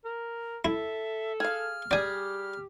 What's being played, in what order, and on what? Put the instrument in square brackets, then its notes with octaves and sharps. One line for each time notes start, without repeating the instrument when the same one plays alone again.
[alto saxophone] A#4
[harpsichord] E4 [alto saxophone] A4 [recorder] E5
[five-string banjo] G#4 F5 [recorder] F6
[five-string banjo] G3 G#4 [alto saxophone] G4 [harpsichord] D5 G#5